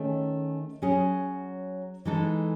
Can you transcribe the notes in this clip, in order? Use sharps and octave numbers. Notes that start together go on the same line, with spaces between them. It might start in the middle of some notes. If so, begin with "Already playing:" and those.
Already playing: D#3 A3 C#4 G#4 C#5
F#3 C#4 G#4
E3 G#3 D#4 A4